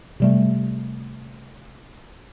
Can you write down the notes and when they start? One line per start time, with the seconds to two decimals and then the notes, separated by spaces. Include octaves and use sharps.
0.20 C3 G3 A3